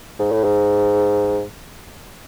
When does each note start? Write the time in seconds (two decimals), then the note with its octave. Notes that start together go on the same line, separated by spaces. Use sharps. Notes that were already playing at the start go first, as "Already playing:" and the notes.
0.20 G#2
0.32 A2
0.44 G#2